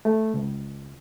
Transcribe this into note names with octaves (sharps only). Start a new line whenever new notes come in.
A3
C#2